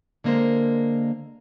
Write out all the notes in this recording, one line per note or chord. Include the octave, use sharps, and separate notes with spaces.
D3 G#3 A#3 A#4 C5